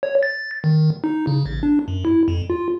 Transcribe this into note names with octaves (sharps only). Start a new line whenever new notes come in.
C#5
A6
D#3
D#4
C#3
A1
D4
F#2
E4
F2
F4